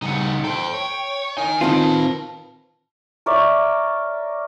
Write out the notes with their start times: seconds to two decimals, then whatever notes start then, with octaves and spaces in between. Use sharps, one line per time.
0.02 C#3 G3 D#4 F#5
0.44 A4 C5 G5
0.74 C#5
1.38 D#4 A#4 G#5
1.61 D#3 C4 F4 B4 A5
3.26 A#4 C#5 D5 E5